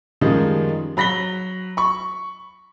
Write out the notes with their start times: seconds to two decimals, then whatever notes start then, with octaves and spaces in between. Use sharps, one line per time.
0.21 F#2 D#3 F3 G3 G#3 D#4
0.97 F#3 B5 A#6 B6 G7
1.77 B5 C#6